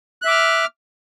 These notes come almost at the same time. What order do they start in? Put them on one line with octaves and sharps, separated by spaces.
F#6 E5 D6 F6